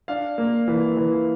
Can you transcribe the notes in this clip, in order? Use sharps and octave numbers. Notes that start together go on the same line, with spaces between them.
D4 F5
A#3
E3
E3